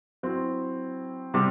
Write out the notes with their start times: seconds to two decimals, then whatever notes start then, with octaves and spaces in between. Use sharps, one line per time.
0.23 F#3 C4 E4
1.34 C3 G3